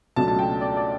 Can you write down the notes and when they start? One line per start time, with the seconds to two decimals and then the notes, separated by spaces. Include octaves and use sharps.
0.16 C#2 B2 F#3 A3 D4 A5
0.28 A5
0.39 G5
0.61 D5
0.77 D5